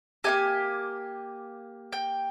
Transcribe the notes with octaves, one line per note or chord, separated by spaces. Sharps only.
A#3 D#4 G4 G#5
G5